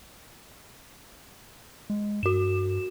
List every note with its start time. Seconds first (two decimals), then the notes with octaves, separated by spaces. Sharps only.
1.90 G#3
2.23 G2 F#4 E7